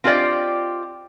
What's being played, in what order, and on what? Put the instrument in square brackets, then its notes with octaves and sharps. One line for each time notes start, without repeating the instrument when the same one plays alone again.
[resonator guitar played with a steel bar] C4 F4 G4 G#4 D5 D#5